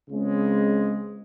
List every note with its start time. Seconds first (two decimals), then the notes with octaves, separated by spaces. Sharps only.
0.08 C#2 C#3 G#3 C4